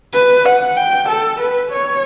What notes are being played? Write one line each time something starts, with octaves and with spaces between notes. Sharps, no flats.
B4
F#5
G5
A4
B4
C#5